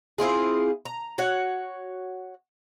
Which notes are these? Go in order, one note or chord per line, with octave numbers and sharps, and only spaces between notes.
C4 E4 F4 G#4
A#5
F#4 C#5 F#5